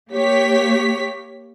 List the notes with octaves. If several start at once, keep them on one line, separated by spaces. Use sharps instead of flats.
A#3 G4 C#5 B6